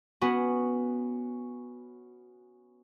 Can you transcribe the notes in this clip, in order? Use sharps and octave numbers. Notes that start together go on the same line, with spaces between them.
B3 C#4 F#4